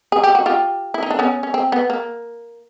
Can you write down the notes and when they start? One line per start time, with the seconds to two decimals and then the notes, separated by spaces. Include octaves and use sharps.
0.12 G#4
0.24 G4
0.35 F#4
0.46 F4 G4
0.94 E4
1.03 D#4
1.10 D4
1.19 B3 C#4
1.43 C#4
1.54 C4
1.72 B3
1.90 A#3